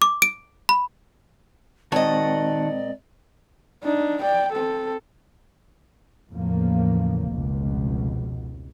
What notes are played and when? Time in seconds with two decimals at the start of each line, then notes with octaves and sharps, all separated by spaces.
0.02 D6
0.22 D7
0.69 B5
1.92 A#2 D#3 G#3 C4 F#4 D5 D#5 A5
3.84 D4 D#4
4.22 D5 G5
4.52 C4 A4
6.31 E2 A2 C#3 F3 A#3
7.29 F1 C#2 B2